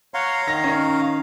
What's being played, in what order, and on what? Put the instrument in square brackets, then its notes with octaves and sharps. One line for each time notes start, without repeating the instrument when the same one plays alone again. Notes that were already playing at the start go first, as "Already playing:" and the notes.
[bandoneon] C#5 F#5 C6 [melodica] F5 A#5
[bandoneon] D#3 [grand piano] A#6
[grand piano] C#4